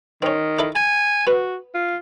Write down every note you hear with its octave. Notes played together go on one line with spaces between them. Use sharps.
D#3 C4 C#4
D4 E4 A4
G#5 A5
B3 F#4
F4